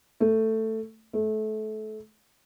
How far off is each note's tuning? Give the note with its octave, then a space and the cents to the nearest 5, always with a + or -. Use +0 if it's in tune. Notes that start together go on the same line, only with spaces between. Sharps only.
A3 +10
A3 -25